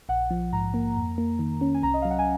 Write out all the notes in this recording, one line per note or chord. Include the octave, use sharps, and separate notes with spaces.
A#1 F#5
F3
G#2 A#5
A#3
F2
A#3
D#3
C#4
G#5
C2 A#5
D#5
F#3 F5
F#5
G#5